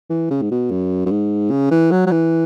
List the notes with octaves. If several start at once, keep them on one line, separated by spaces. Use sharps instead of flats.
E3
C#3
G#2
B2
F#2
F#2
G#2
C#3
E3
F#3
F#3
E3